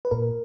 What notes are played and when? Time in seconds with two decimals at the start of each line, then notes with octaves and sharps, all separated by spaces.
0.05 B4
0.11 A#2 A#4